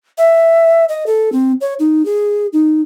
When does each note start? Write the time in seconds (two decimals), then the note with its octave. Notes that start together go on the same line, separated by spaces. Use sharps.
0.18 E5
0.89 D#5
1.06 A4
1.32 C4
1.61 C#5
1.79 D#4
2.06 G#4
2.53 D#4